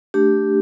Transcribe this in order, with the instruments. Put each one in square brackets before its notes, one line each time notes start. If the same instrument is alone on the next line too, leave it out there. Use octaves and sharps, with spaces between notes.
[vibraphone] A3 D4 G4